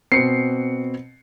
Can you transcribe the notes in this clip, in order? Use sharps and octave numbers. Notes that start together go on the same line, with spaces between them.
B2 C4 C7 C#7